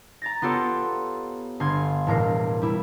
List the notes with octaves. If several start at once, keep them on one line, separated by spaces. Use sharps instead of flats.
A#5 A6 A#6
B3 F4 G4 A4 C#5
G1 F5 C6 G#6
E1 A2 A#4 C7
G3 E4